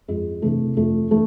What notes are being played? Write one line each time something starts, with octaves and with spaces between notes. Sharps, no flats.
F2 G#3
C3 E3 A3
F2 A3
E3 A3